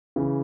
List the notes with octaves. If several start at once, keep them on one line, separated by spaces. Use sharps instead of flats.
C#3 E3